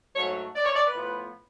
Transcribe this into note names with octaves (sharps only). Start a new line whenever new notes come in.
G#2 F#3 A3 C#5
D5
C#5
D5
B4
A2 F3 B3